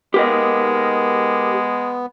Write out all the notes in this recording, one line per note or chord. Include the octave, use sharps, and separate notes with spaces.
G#3 B3 G4 A#4 D#5